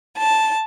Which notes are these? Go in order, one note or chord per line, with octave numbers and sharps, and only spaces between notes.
A5